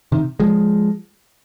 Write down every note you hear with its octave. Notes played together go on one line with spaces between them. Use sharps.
C3 D#3
F3 G#3